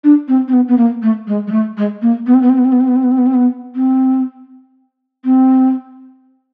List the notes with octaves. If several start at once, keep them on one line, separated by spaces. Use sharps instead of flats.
D4
C4
C4
B3
B3
A#3
A3
G#3
G#3
A3
G#3
A#3
B3
C4
B3
C4
B3
C4
B3
C4
B3
C4
B3
C4
B3
C4
B3
C4
C4